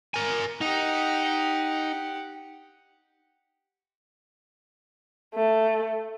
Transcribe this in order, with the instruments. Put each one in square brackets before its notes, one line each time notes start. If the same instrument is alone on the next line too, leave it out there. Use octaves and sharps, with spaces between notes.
[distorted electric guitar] A#4 G#5
[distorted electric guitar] D#4 [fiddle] G4 F#5
[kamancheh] A3